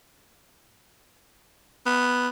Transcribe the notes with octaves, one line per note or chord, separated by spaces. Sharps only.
B3